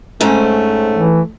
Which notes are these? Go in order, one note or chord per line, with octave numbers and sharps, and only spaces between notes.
G#2 A3 C4 C#4
E3